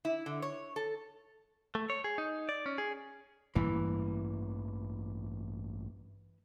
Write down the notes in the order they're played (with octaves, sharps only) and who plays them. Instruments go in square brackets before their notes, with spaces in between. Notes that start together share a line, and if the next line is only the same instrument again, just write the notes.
[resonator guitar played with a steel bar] E4
D3
C#5
A4
[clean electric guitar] A3
C#5
G#4
D#4
D5
C#4
G#4
[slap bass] A1 G2 A#3 [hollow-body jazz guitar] E3